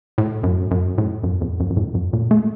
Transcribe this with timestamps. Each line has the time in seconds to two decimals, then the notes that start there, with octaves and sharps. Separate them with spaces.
0.18 A2
0.43 F#2
0.71 F#2
0.98 A2
1.23 F#2
1.41 F2
1.60 F#2
1.70 F#2
1.77 A2
1.95 F#2
2.13 A#2
2.31 A3